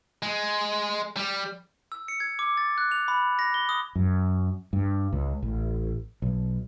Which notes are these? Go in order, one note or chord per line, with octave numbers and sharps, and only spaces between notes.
G#3
G3
E6
C#7
G#6
D6
A6
F#6
F7
B5
A#6
G7
D#6
F#2
G2
C#2
A1
B1